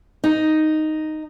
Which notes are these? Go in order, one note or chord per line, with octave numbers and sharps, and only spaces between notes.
D#4